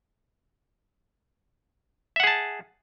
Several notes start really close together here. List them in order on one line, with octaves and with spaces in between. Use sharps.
E5 F#5 G#4 A5